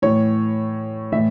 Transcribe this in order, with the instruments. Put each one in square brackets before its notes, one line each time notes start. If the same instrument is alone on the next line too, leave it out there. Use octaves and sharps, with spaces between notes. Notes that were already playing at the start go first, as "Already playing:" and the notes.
[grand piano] A2 E3 C#5
A2 E3 E5